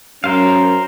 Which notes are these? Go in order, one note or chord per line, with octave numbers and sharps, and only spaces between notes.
F#2 C#4 A#4 C5 F5